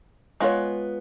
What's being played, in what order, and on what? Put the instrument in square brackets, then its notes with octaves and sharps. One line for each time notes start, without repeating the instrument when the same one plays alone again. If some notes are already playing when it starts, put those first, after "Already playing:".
[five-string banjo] G#3 B3 F4 A#4 C#5